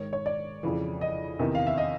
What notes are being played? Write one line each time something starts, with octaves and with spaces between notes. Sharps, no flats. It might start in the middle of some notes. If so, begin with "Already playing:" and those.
Already playing: G#2 D#3 C#5
C#5
D5
F2 C#3 E3
D#5
E2 C3 D#3
F5
E5
D#5